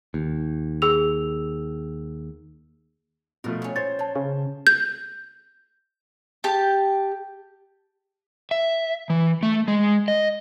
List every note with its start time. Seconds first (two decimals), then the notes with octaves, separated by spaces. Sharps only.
0.14 D#2
0.82 G#4 E6 F7
3.44 B2 F3 A3 A#4
3.62 A#2 C#4
3.76 C5 C#5 A6
3.99 F#3 C#5 A5
4.16 C#3
4.67 G6
6.44 G4 A5
8.51 E5
9.10 E3
9.43 A3
9.68 G#3
10.08 D#5